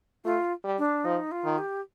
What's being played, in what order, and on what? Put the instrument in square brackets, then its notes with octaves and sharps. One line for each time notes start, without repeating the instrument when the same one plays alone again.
[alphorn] A3 [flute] F4
[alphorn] G3
[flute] D4
[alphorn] F3 [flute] D#4
[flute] F4
[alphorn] D#3
[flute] G4